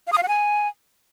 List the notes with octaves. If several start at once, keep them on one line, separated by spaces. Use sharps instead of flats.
F5
D#6
F5
F#5
G#5